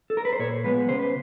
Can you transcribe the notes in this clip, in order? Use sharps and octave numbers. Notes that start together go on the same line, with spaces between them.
A4
A#4
B4
C5
A#2 C#5
F3 G#3 B3 B4
C#3 C5
B4